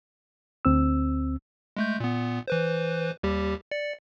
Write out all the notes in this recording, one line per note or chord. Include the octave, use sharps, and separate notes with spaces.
D2 C4 E6
G#3 A3 G6
A#2 B3
E3 B4 C5
D#2 G3 G4
D5 C#7